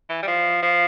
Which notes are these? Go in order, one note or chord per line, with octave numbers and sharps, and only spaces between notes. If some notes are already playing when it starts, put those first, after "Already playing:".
E3
G3
F3
F3